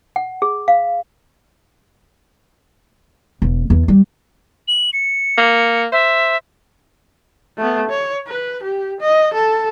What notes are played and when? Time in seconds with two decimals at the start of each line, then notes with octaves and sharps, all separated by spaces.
0.16 F#5
0.42 G#4
0.68 F5
3.42 E1
3.70 E2
3.88 G3
4.68 F#7
4.93 C#7
5.38 A#3
5.92 C5 E5
7.58 A3 B3
7.90 C#5
8.27 B4
8.63 G4
9.01 D#5
9.34 A4